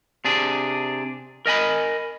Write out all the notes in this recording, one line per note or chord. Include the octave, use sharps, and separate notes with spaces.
C3 D4 G#4
A#4 D#5 G#5 B5